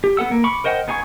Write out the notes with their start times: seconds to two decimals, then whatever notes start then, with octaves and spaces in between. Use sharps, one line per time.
0.04 G4
0.17 B3 A4 F#5 E6
0.31 A#3
0.44 B5 C#6 D6
0.64 A#4 C5 D#5 F#5 G5
0.88 B3 D#4 G#4 G#5 C#6